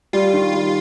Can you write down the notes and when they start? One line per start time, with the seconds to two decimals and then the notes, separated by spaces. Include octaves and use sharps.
0.13 G3 F4
0.33 D#3
0.53 G3